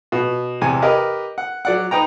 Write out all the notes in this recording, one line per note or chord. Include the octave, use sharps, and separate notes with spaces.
B2
E2 C3 G#5
G4 A#4 B4 D#5
F#5
F#3 D5 F#5
D#4 B4 G5 A#5